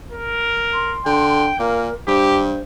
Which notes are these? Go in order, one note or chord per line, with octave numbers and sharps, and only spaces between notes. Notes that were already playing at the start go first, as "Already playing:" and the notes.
A#4
C6
D3 G5
A#2 A#3 A#4
G2 G4 C5